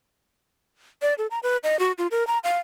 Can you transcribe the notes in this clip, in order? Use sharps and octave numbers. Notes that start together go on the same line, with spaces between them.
D5
A4
A#5
B4
D#5
F#4
F4
A#4
A#5
F5